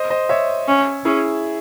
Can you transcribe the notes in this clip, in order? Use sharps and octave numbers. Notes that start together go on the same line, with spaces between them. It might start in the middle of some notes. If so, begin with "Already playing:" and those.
Already playing: C5 D#5
C5 D#5
C#5 E5
C#4
C#4 E4 G#4